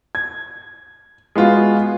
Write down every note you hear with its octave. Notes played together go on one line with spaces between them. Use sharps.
G#6
G#3 B3 F4 F#4